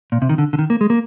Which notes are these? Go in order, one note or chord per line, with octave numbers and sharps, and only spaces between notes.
A#2
C3
D#3
D3
D3
D#3
A#3
G#3
A#3